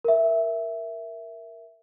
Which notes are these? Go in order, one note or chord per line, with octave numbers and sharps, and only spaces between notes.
A#4 E5